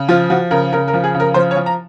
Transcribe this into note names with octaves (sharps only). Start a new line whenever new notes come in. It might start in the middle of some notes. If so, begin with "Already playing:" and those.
Already playing: C#3
F3 F4
F3 F#4
C#3 A#4
C#3 A#4
A#4
F3
G#4
C#3
A#4
F3 C5
C#5
F3
A#5